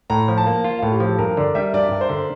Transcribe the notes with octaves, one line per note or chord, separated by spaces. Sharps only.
A2 A#5
F3
A5
A#3
F4
A2 F5
G4
F3 A4
G2 A#4
D3 D5
G3 E5
G2 D5
G2
C5
D3